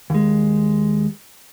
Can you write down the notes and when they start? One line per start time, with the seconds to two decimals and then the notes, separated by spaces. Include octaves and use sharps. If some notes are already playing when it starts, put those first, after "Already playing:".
0.10 D#2 G#3